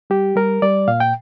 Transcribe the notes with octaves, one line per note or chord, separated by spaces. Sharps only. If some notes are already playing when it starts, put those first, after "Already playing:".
G3 G4
G3 A#4
G3 D5
A#2 F5
G5